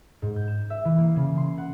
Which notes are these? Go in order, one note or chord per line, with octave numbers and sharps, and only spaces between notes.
G#2
G6
E7
E5
E3
A#3
C#3
C6
F#5